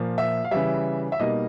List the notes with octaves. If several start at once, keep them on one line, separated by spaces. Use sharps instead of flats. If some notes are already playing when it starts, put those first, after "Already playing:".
Already playing: A#2 F3 A#3
E5
F5
C#3 E3 G3 E5
E5
B2 G3 A#3 D#4 D#5